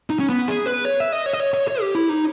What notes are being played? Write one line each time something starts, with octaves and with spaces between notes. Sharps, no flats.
D#4
C#4
B3
G#4
B4
C#5
E5
D#5
C#5
D#5
C#5
C#5
C#5
G4
E4
D#4